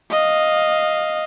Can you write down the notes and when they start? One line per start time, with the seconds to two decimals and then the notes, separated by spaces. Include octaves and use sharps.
0.11 D#5 F5